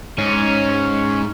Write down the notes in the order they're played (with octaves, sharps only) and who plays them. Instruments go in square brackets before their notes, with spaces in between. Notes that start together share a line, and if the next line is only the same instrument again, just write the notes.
[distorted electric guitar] G#2 [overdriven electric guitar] C#4